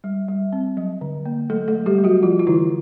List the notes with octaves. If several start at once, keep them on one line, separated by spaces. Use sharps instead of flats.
G3
G3
C4
F#3
D3
A#3
F#3 A3 A4
A3 A4
F#3
G3 G4
A3
F#3 F#4
F3 F4
F4
D3 E3 E4